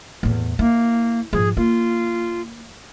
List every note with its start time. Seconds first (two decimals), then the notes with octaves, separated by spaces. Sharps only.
0.23 E2 A2
0.59 A#3 E4
1.33 G#2 F3 G#4
1.57 A#3 F4